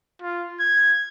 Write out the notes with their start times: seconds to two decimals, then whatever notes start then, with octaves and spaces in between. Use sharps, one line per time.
0.22 F4
0.60 G#6